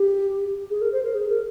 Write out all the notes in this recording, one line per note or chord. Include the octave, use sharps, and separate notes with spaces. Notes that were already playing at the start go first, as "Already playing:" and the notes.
Already playing: G4
G#4
A#4
C5
A#4
G#4
A#4